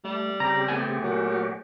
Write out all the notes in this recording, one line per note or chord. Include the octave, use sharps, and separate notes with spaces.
G3 A3
C#3 C4 G4 A#5
A3 B3 G#5
A#2 F#3 F#4 G4